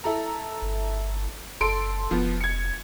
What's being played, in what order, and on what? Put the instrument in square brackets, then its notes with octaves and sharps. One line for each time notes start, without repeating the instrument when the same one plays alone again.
[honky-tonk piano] E4 A4 A#5
[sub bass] G1
[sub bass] F#1 [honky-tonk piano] A4 C6 D7
[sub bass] F1 [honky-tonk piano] F3 B3
[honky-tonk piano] G#6 C#7